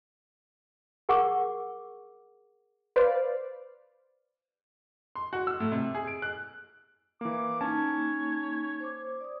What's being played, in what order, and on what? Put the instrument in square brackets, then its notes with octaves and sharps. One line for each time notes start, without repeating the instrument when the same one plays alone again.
[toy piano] G#4 A#4 F#5 C#6 D6
[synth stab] B4 C5 D5 F5
[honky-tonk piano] C6
F#4
E6
A2
C3
G#4
D7
F#6
[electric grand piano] E3 A#3 [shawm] D6
[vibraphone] A#3 D#4 [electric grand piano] C#4 A5 [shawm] C#5
[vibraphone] C5 D6
D5 D#6